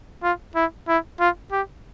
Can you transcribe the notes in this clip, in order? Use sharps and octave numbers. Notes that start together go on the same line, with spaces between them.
F4
E4
E4
F4
G4